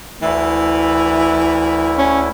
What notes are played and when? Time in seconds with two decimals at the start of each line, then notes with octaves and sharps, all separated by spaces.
0.22 D2 E3 E4
1.98 C#4